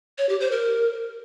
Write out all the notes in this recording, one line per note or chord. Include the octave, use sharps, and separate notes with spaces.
C#5
G4
C5
A#4